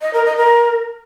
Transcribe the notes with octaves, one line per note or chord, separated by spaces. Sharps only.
D#5
A#4
D#5
A#4